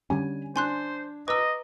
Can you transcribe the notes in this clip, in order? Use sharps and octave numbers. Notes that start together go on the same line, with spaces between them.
D3 G3 C#4 G#5
D4 C5 G#5 C6 F#6
B4 D#5 A#5 D6 E6